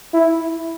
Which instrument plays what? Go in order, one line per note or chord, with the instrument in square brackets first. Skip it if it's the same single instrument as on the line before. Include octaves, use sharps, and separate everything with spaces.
[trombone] E4